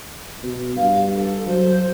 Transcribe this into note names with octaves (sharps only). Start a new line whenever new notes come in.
B2
G2 F5
A4
F#3 C5